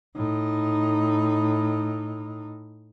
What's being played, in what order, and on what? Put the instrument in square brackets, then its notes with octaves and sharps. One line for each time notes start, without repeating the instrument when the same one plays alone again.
[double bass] A2 D#4